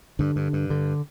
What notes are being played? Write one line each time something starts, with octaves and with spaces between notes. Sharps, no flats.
G2 D3
G2
G2
D3